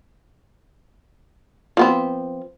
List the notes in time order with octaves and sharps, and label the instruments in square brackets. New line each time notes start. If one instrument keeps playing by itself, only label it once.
[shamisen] F3 B3 C4